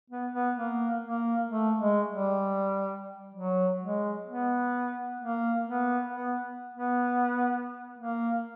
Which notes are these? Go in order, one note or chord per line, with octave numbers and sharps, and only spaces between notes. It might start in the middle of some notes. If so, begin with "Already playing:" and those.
B3
B3
A#3
A#3
A3
G#3
G3
F#3
G#3
B3
A#3
B3
B3
B3
A#3